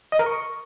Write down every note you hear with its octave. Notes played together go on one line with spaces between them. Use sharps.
D#5
A#4
C#6